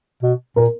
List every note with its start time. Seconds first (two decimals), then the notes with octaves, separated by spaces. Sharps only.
0.23 B2
0.56 A#2 A#4